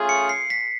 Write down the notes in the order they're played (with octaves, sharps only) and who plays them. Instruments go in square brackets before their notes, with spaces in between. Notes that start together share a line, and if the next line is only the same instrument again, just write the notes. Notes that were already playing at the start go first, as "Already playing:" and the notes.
Already playing: [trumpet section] A3 C#4 F4 G#4
[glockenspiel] C#7
C7
B6